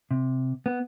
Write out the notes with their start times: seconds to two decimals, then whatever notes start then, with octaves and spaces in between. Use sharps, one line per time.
0.11 C3
0.66 B3